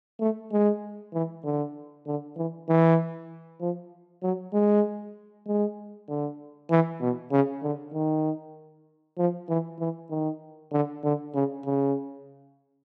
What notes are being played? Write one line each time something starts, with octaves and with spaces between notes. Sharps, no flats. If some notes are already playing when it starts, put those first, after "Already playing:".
A3
G#3
E3
D3
D3
E3
E3
F3
F#3
G#3
G#3
D3
E3
B2
C#3
D3
D#3
F3
E3
E3
D#3
D3
D3
C#3
C#3